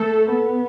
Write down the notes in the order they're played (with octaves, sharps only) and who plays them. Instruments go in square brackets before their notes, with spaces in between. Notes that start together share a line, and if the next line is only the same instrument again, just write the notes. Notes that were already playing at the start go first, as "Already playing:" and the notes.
Already playing: [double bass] A3 [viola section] A4
[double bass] B3